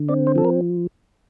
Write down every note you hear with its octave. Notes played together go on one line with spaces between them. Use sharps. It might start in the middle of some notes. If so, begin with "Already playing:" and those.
Already playing: D3
C4 D5
C5
F3 A4
A#4